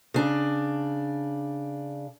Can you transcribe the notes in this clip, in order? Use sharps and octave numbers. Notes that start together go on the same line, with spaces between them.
C#3 D4